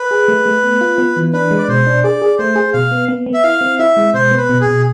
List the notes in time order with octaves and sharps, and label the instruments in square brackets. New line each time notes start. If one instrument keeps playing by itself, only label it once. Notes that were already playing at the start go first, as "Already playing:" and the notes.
Already playing: [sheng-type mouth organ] B4
[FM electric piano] G#4
A3
A3
B3
F4
B3
E3
[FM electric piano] D4 [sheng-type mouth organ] B4
[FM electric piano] G#3
[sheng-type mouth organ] D5
[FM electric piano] B2 [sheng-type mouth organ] C5
[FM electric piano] D4
[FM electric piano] G#4 [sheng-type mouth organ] D5
[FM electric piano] G#4
[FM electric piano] A3 [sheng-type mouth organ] C5
[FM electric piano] G#4
[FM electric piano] B2 [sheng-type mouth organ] F5
[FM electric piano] B3
B3
B3
[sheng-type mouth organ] E5
[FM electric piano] E4 [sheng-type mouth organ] F5
[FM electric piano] C4
[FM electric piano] E4 [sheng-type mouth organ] E5
[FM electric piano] G#3
[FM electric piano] B2 [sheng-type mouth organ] C5
[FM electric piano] B3
[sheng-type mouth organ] B4
[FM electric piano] B2
[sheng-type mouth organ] G#4
[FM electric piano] B2